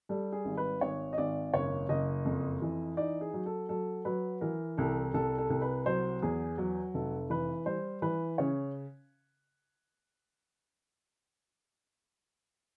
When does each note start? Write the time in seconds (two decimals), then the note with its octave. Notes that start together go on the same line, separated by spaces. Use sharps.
0.09 G3 A4
0.32 G#4
0.45 G#1
0.57 B4
0.81 G#1 C#5
1.13 D#5
1.18 G#1 D5
1.54 F#1 C#5
1.89 F#1 D#5
2.25 F2
2.62 E3
2.97 D#4 D5
3.21 G#4
3.34 F#3
3.46 A4
3.69 F#3 A4
4.05 F#3 B4
4.41 E3 A#4
4.77 C2 A4
5.14 C2 A4
5.38 A4
5.50 C2
5.62 B4
5.86 F#3 C5
6.22 E2 G#4
6.58 F#3
6.94 F1 A4
7.30 E3 B4
7.66 G3 C5
8.02 E3 B4
8.38 C#3 C#5